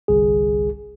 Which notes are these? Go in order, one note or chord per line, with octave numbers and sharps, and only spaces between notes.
G1 C2 G#4